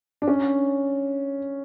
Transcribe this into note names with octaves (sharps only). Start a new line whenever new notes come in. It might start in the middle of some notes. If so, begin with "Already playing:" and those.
D4
C#4